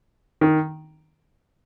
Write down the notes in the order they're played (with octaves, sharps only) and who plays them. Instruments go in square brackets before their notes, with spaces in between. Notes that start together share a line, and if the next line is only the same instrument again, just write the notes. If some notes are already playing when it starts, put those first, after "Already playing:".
[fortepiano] D#3